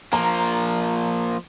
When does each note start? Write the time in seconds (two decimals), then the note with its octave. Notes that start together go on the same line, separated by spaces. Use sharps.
0.13 F3 A#3 A#5